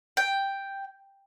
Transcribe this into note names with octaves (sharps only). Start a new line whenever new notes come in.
G5